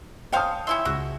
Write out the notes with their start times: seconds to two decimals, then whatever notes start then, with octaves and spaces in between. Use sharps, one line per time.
0.32 C#3 C5 F5 G5 A5 D#6
0.67 C#4 E4 E5 C6
0.85 C#2 F#4